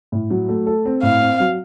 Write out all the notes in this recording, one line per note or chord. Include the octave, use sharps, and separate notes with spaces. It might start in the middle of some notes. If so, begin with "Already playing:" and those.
A2
F#3
A3
A4
C4
A2 F5
C4
F#3